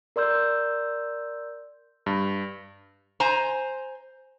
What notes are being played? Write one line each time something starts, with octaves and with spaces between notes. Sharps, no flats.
A#4 D5 C6 E6 G6
G2
C5 G#5 A#5